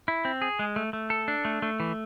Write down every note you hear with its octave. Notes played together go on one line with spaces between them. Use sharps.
E4
C4
G#4
G#3
A3
A3
A4
D4
A3
A3
E3